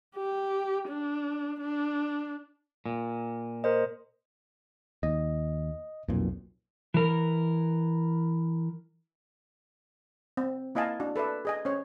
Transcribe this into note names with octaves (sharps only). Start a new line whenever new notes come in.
G4
D4
D4
A#2
A#4 C5 D#5
D#2 D#5
B1 F2 A#2
E3 A#4
C4
A#3 E4 D#5 F5 G#5 A5
D4 F#4
A4 B4 D5 E5
G#4 D#5 G#5
C#4 C5 C#5